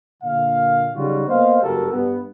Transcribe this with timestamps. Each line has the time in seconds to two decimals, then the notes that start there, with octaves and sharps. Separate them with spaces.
0.23 A#2 D3 F5
0.95 C#3 F#3 G3 D#4 F4 F#4
1.28 A#3 B3 C5 D#5 F5
1.62 F#1 G2 F#4 G4 A4 A#4
1.92 G2 B3